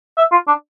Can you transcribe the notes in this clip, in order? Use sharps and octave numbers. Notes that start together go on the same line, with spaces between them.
E5
F4
D4